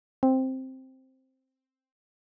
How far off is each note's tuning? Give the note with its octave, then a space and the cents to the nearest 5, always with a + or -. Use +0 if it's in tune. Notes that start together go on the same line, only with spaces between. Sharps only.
C4 +5